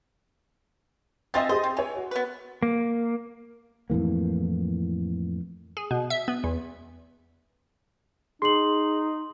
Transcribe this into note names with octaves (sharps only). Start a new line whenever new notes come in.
C4 F4 D#5 E5 G#5 A6
G4 G#4 C5 D#5
C4
E3 C#5 G#5
F#4
B3 B4
A#3
F2 A2 E3 A#3
G#4
B2
E5
B3
E2
D#4 G#4 C6 C7 F#7